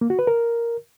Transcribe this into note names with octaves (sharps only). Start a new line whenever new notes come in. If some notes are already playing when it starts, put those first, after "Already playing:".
A#3
F#4
B4
A#4